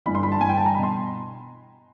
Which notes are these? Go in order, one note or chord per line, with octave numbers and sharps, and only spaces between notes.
G1 G2 E3 B5
C6
B5
A5
G1 G2 E3 G#5
G5
A5
A#5
B2 B5
C6